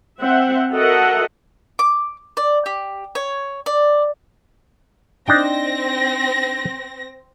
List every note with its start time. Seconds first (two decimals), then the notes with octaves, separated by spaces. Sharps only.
0.20 C4 E5 F#5
0.71 F#4 A4 A#4 D#5 E5 F#5
1.79 D6
2.37 D5
2.66 G4
3.15 C#5
3.66 D5
5.28 C4 D4 D#4 G5 A#6